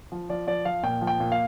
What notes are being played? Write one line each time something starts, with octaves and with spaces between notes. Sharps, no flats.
F3
F3 D5
F3 D5
F3 F5
A#2 G5
F3
G5
A#2
F5